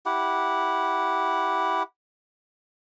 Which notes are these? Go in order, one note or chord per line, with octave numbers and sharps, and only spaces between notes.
E4 G4 F#5